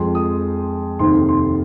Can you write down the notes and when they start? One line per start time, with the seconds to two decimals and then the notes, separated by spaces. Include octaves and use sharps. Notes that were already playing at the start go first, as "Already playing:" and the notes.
Already playing: F2 F3 G#3 C6
0.15 D#6
0.99 F1 D#2 D#3 C4 C6
1.29 C6